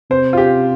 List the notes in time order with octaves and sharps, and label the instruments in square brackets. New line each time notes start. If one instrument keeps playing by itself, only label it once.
[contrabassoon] C3 [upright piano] C5
[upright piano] F4
G4